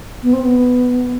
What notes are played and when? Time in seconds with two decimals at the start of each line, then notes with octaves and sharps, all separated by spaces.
0.23 B3
0.33 C4
0.43 B3